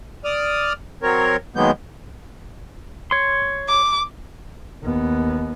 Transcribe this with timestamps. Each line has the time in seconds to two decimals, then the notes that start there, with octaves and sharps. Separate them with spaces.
0.25 D5 D#6 F6
1.03 F#3 C4 A#4 C#5
1.56 D#3 F#3 G#3 A#3 B3 G6
3.11 C#5 C6
3.68 D6
4.83 D#2 B3